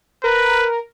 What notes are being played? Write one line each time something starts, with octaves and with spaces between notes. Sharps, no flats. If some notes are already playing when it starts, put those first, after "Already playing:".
A#4 B4